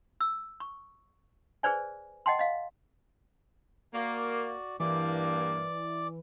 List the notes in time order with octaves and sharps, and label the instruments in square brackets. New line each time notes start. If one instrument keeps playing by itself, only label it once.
[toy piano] E6
C#6
G#4 B4 C5 D5 G#5
D#5 F#5 G5 A5 C6
D#5 F5
[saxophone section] A#3 [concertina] F#4 D5
[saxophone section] G2 A#3 [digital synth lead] E3 [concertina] D5 D6